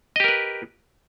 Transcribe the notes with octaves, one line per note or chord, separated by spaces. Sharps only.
G4 A#4 B4 D#5